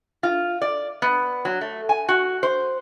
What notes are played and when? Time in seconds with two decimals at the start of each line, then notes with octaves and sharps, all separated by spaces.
0.23 F4
0.62 D5
1.02 B3
1.45 F#3
1.61 A3
1.89 G#5
2.09 F#4
2.43 C5